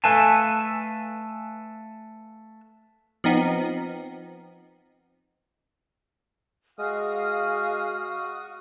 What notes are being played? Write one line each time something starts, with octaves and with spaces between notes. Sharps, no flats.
A3 A4 B4 F5 G#5 A5
F3 B3 C4 D#4
G#3 F#4 F5 D#6 F6